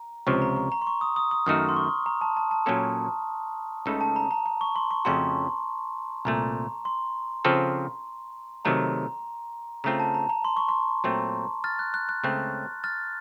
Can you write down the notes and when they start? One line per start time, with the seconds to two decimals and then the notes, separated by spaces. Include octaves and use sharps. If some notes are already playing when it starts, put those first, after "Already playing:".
Already playing: A#5
0.27 C#2 C3 F3 C#6
0.42 A#5
0.56 A#5
0.72 A#5
0.82 C6
0.87 C#6
1.01 D#6
1.16 D#6
1.31 D#6
1.46 F#2 D#3 A3 D#4 F#4 F6
1.69 C6
1.77 C#6
2.06 A#5
2.21 A5
2.37 A5
2.51 A5
2.66 A#2 F#3 A#3 C#4 A4
3.86 C#2 C#3 A3 D#4 A4
4.01 A5
4.16 A#5
4.31 A#5
4.46 A#5
4.61 C#6
4.76 C6
4.91 C#6
5.05 F2 C#3 A3 C#4 F#4 C6
6.25 C2 A#2 A3 A#5
6.85 C6
7.45 C#3 F3 C4 F4 A4
8.65 C3 D#3 F#3 A3 A#5
9.84 C#3 A3 C4 F4 A#5
10.00 A5
10.14 A#5
10.29 A#5
10.45 C6
10.57 C#6
10.69 C6
11.04 A#2 F#3 A3 C4
11.64 F6 A6
11.79 F#6
11.94 F#6
12.09 F#6
12.23 C#2 C#3 A3 C4 F#6
12.84 F6 A6